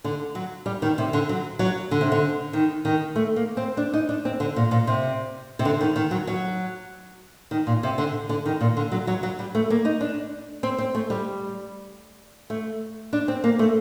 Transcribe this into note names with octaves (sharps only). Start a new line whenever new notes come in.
D3
F#3
G3
D#3
C3
D3
F#3
F#3
D3
C3
D3
D#3
D#3
A3
A#3
C4
D4
D#4
D4
C4
D3
A#2
A#2
C3
C3
D3
D#3
D#3
F#3
F#3
D#3
A#2
C3
D3
D3
D#3
A#2
D3
F#3
F#3
F#3
G3
A3
A#3
D#4
D4
C4
C4
A3
G3
A3
D4
C4
A#3
A3